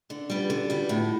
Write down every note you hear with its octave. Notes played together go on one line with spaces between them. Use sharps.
D3 D4
C#4
G3 B3 F4
G4
D3 G4
F#4
G3 B3 F4
A2 F4